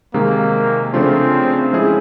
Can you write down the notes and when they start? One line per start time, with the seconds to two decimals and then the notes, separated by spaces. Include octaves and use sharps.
0.14 C3 D#3 G#3 A#3
0.94 C#3 F3 A3 C4 D4 F4
1.73 F3 G#3 C#4 E4 G#4